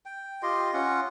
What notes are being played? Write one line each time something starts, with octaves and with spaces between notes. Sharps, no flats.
G5
F4 G4 D#5 C6
C#4 F4 F#5